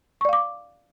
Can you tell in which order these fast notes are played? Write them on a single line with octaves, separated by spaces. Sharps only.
C#6 D5 F5 D6